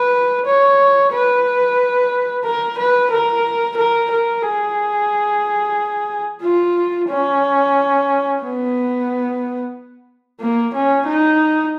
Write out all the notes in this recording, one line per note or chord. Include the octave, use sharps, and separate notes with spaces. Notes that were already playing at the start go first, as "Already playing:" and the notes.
Already playing: B4
C#5
B4
A#4
B4
A#4
A#4
A#4
G#4
F4
C#4
B3
A#3
C#4
D#4